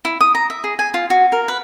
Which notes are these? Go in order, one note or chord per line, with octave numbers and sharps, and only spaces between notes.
E4
D#6
A#5
E5
G#4
G#5
F4
F#4
A#4
B4